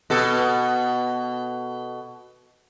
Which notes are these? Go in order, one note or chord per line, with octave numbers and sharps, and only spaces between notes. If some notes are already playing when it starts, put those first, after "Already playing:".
B2 A4